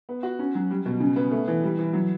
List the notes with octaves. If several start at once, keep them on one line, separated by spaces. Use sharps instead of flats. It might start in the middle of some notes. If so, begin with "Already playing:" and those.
B3
F#4
C#4
F#3
G3
B2
C#3
B3
A3
E3
G3
E3
F#3